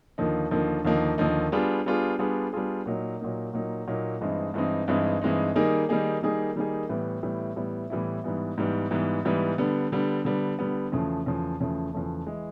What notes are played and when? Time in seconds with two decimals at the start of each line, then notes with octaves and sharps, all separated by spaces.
0.18 D#2 D3 F3 A#3 D#4
0.51 D#2 D3 F3 A#3 D#4
0.85 D#2 D3 F3 A#3 D#4
1.18 D#2 D3 F3 A#3 D#4
1.52 G3 B3 D4 F4 G#4
1.86 G3 B3 D4 F4 G#4
2.19 G3 B3 D4 F4 G#4
2.53 G3 B3 D4 F4 G#4
2.86 A#2 F#3 A#3 D#4
3.20 A#2 F#3 A#3 D#4
3.53 A#2 F#3 A#3 D#4
3.88 A#2 F#3 A#3 D#4
4.21 G2 E3 G#3 C4 D#4
4.54 G2 E3 G#3 C4 D#4
4.88 G2 E3 G#3 C4 D#4
5.21 G2 E3 G#3 C4 D#4
5.56 D#3 G3 A#3 D#4 G#4
5.89 D#3 G3 A#3 D#4 G#4
6.22 D#3 G3 A#3 D#4 G#4
6.56 D#3 G3 A#3 D#4 G#4
6.89 A2 E3 G3 B3 E4
7.23 A2 E3 G3 B3 E4
7.56 A2 E3 G3 B3 E4
7.90 A2 E3 G3 B3 E4
8.24 G#2 E3 G3 B3
8.58 G#2 E3 G3 B3
8.91 G#2 E3 G3 B3
9.25 G#2 E3 G3 B3
9.58 D3 G3 B3
9.92 D3 G3 B3
10.25 D3 G3 B3
10.59 D3 G3 B3
10.92 E2 C#3 F3 A3
11.26 E2 C#3 F3 A3
11.60 E2 C#3 F3 A3
11.93 E2 C#3 F3 A3
12.26 E3 G#3